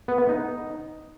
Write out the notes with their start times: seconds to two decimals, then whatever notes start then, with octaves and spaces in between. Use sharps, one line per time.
0.08 B3
0.18 B3
0.29 D#4